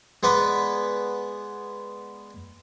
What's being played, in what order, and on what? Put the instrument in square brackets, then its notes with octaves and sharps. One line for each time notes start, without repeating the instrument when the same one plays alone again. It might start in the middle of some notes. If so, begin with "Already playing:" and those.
[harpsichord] G#3 B3 B4 D5